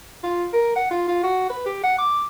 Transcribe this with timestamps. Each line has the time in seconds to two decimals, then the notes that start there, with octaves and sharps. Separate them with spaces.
0.23 F4
0.53 A#4
0.76 F#5
0.91 F4
1.08 F4
1.23 F#4
1.50 B4
1.66 G4
1.84 F#5
1.98 D6